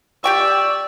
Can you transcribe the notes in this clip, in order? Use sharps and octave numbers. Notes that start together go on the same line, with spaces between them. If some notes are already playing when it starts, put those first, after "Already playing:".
G4 D5 G5 C#6 E6